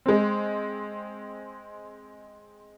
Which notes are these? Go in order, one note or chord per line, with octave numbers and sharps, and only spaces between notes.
G#3 C4